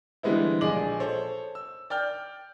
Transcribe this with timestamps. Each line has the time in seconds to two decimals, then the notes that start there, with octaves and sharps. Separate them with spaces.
0.23 D3 E3 G3 G#3 B3 E4
0.61 A#1 G#4 D#5 D6 F#7
1.00 A4 C5 C#5
1.55 E6
1.90 D5 G5 F6 G6